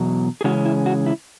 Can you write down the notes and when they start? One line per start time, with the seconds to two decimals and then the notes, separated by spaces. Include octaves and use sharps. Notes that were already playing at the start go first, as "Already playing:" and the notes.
Already playing: E2 B2 F#3
0.41 G#4
0.44 C#3 E3 G#3 C#4 F#4
0.65 E4
0.86 F#4
1.06 E4